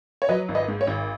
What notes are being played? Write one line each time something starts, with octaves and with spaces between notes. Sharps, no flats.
C#5
F#3 B4 D#5
G#1
B4 D#5
G#2
C#5
G#1